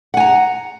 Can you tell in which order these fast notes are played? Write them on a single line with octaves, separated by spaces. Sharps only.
F#5 G#5 A#5